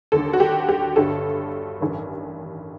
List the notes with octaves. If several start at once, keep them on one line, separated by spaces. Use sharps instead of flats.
D#2 D3 A4
F#4
G4
G4
G1 G2 D3 A4
A1 G2 D#3